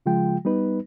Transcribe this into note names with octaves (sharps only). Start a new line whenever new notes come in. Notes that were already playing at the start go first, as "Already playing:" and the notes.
C#3 F3 G#3 F4 G5
G3 B3 D#4 B4